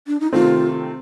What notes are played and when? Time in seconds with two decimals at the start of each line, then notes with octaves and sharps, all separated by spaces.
0.07 D4
0.20 D#4
0.32 C3 D#3 A3 C4 F4